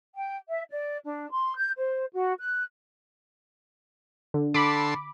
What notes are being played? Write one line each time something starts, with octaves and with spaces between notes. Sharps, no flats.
G5
E5
D5
D4
C6
G6
C5
F#4
F#6
D3
D3 A4 B5 C6 D6